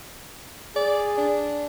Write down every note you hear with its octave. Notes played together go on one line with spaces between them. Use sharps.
G#4 D5
D4